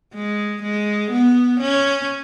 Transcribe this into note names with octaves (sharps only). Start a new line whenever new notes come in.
G#3
G#3
B3
C#4